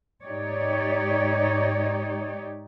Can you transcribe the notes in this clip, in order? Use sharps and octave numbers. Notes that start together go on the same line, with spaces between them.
G#2 D#4 G4 C#5 D5